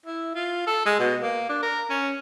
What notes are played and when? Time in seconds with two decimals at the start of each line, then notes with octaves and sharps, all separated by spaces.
0.06 E4
0.35 F4
0.67 A4
0.86 G#3
1.00 B2
1.22 A#3
1.49 D4
1.63 A#4
1.90 C#4